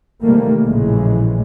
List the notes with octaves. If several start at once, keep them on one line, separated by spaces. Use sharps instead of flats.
C3 D#3 E3 G3 A3 A#3
A#1 A2 C#3 E3 G#3